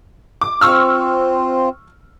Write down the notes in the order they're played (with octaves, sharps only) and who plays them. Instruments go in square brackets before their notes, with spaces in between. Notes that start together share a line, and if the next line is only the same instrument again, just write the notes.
[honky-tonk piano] D6
[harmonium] C4 F4 [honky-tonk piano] C#6 E6 F6